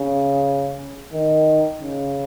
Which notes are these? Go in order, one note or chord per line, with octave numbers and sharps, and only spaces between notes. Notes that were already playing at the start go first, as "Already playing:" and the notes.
Already playing: C#3
D#3
C#3